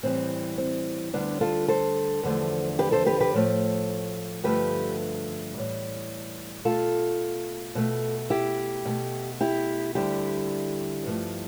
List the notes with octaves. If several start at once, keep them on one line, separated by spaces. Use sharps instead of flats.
A2 E3 G3 C4
C4
D2 D3 G3 B3 D4
F4 A4
A4 C5
E2 D3 F3 A3
G4 B4
A4 C5
G4 B4
G4 B4
A2 F3 A3
G2 D3 F3 A3 G4 B4
A2 E3 G3
B2 A3 F4 A4
B2 A3
E4 G4
B2 A3
E4 G4
D2 D3 G3 E4 G4
G2 F3 A3